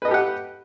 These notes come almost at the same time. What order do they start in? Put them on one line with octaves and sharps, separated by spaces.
B4 D#5 A4 G4 F#5